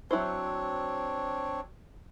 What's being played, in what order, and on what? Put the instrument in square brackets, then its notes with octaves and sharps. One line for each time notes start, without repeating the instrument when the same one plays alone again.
[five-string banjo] F#3 E4 C5 [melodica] C4 D4 C#5